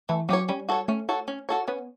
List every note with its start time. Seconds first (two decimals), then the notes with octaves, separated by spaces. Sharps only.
0.09 E3 A3
0.29 F#3 C#4 G4 C#5
0.49 G3 C#4
0.69 F#4 A4 C#5
0.88 A3 C#4
1.09 F#4 A4 C#5
1.28 C#4
1.49 F#4 A4 C#5
1.68 B3 C#4